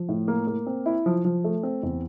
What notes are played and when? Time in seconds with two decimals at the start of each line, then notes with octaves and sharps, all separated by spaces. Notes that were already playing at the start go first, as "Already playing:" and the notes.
Already playing: F3
0.09 A2
0.28 A#3
0.47 A#3
0.67 C4
0.86 E4
1.06 F3
1.25 F3
1.44 A3
1.63 C4
1.83 E2